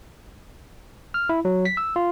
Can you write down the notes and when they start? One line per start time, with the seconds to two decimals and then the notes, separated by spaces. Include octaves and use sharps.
1.14 F6
1.29 E4
1.45 F#3
1.65 B6
1.77 E6
1.96 F4